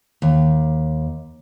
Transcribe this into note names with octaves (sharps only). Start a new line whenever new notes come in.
D#2